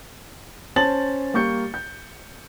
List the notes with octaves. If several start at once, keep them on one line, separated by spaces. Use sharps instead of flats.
C#4 C5 A5 A6 F#7
G3 A#3 C#6 G6 C#7
G6